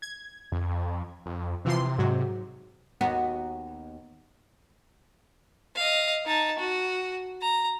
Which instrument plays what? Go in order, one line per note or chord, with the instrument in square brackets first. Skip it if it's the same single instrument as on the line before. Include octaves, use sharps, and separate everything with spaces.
[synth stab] G#6
[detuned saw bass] F2
F2
[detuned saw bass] C3 [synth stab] E3 F3 C6
[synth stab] G#2 F#3
[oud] D#2 B3 F#4
[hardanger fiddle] D#5 F5
D#4 A5
F#4
A#5